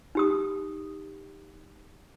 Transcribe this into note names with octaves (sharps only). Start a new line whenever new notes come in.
D#4 G4 D#6